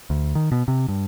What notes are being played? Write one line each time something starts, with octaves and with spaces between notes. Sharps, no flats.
D2
D#3
B2
C3
G2